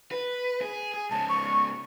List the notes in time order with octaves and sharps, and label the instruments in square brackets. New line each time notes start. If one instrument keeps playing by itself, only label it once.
[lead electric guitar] B4
G#4
G#4
[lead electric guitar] G#2 C#3 [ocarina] A5
[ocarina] C#6